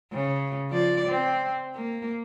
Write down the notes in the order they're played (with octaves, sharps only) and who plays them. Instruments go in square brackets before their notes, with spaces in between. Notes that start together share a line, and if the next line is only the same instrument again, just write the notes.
[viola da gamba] C#3
F3 D5
C4
A#3